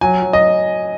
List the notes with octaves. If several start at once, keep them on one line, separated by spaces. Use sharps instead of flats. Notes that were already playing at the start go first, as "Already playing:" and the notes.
F#3 G#5
F#3
D#5